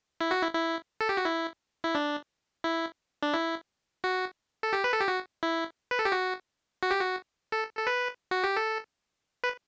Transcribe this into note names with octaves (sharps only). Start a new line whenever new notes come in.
E4
F#4
E4
E4
A4
G4
F#4
E4
E4
D4
E4
D4
E4
F#4
A4
G4
B4
A4
G4
F#4
E4
B4
A4
G4
F#4
F#4
G4
F#4
A4
A4
B4
F#4
G4
A4
B4